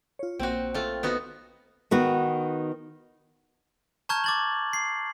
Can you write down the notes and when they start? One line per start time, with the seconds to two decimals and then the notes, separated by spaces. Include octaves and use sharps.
0.19 F4 C#5
0.39 A#1 A#3 C4 F#4 G5
0.74 A3 F4
1.03 B3 D#4 F#4
1.91 D#3 B3 F#4
4.09 A5 A#5 C#6 F6 G6 G#6
4.24 D6 A6 F#7
4.73 C7